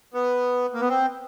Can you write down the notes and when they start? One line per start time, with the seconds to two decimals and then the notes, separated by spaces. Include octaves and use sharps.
0.14 B3
0.74 A#3
0.81 B3
0.89 C4